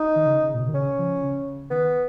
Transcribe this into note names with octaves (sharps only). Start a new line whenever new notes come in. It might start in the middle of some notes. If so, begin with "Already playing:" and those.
Already playing: D#4
D#3
C#3
C#3
A#2
B2
D#3
C#3 C#4
F3
C#3
D#3 B3